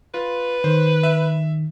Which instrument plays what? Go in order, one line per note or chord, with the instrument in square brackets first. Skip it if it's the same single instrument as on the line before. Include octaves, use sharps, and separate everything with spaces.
[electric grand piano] F4 [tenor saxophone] B4
[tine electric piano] D#3 [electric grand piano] C5
[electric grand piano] E5